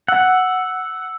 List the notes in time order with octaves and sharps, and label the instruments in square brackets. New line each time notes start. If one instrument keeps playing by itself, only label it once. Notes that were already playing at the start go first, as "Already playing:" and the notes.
[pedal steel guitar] F#5 [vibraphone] E6